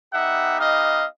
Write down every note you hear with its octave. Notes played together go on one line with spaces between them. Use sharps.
B3 D#4 G4 E5 F#5
D#5 F5